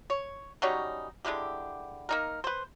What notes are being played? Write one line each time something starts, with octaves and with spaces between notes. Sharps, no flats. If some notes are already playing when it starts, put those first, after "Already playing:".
C#5
F#3 G3 C#4 D#4
D3 G#3 E4 G4
A#3 D#4 A#4
B4 C5